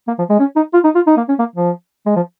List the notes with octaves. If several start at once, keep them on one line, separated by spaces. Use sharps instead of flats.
A#3
F3
G#3
C#4
D#4
F4
D#4
F4
D#4
A#3
C#4
A#3
F3
G#3
F3